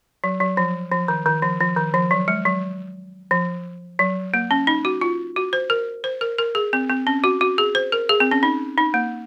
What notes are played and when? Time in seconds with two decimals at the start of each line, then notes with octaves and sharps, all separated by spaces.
0.24 F#3
0.40 F#3
0.57 F3
0.92 F3
1.08 D#3
1.26 D#3
1.42 F3
1.60 F3
1.77 D#3
1.94 F3
2.11 F#3
2.28 G#3
2.46 F#3
3.31 F3
3.99 F#3
4.34 A#3
4.51 C#4
4.67 D#4
4.85 F#4
5.01 F4
5.36 F#4
5.53 C5
5.70 A#4
6.04 C5
6.21 A#4
6.38 A#4
6.55 G#4
6.73 C4
6.89 C4
7.07 C#4
7.24 F#4
7.41 F#4
7.58 G#4
7.75 C5
7.92 A#4
8.09 G#4
8.20 C4
8.31 C#4
8.43 D#4
8.78 D#4
8.94 A#3